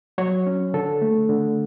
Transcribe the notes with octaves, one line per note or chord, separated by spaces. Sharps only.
F#3 C#5
C#4
D3 A4
A3
D3